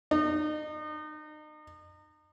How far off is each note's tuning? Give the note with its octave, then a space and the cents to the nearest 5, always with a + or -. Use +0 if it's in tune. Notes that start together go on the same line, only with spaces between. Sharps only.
D#4 -35